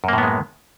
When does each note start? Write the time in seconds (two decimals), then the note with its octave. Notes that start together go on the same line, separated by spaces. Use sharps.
0.04 F#2
0.08 A#3
0.13 A2
0.18 B3
0.23 G#3